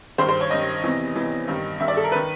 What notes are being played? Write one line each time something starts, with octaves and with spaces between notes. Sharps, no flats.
G2 D#3 C5
C5
C#5
G2 D#3 D#5
E2 C3 E3
E2 C3 E3
G2 D#3
G2 D#3 E5
D5
A4
A#4
D#3 B4